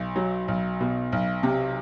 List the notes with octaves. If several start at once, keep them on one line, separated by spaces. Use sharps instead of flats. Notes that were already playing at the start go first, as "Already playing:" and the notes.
Already playing: B1
F#3
B1
B2
B1
C3